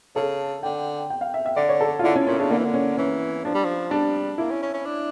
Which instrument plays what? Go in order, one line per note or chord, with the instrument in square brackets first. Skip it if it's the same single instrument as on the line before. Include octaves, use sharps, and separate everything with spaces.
[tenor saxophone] C#3 [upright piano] A4
[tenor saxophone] D3 [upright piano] G5
[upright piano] G5
F5
E5
E5
[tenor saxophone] D3 [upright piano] D5
[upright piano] C#5
A4
F4
[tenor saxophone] D3 [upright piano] E4
[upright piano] C#4
[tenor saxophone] A#2 [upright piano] C#4
[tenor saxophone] C#3 [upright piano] D4
[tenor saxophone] D3 [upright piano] A#3
[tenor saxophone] E3
D3
[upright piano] C#4
[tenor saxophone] E3 [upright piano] C#4
[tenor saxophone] F3 [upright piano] D4
[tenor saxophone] G3
F3
[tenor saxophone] G3 [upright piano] D4
[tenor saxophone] A#3 [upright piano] E4
[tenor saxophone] C#4
C#4
C#4
D4